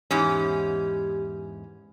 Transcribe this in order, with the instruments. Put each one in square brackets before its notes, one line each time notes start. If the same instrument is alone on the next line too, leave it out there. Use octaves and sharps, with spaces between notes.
[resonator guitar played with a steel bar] E2 G#2 C#4 [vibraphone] G4